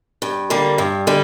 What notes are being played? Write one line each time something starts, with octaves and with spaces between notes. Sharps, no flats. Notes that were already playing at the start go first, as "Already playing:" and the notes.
G2
D3 G3 A#3
G2
D3 G3